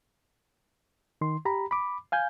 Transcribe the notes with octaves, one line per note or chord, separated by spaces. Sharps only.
D#3 C6
G4 A#5 B5
B5 D6
F5 G#5 G6